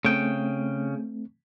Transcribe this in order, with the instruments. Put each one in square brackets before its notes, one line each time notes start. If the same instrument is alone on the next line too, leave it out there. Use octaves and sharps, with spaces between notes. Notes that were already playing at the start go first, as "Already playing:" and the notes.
[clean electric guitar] C#3 G5 [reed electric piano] A3 C4